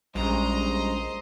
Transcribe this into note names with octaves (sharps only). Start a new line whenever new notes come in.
A#1 G2 C#3 G#3 C5 D#5 A#5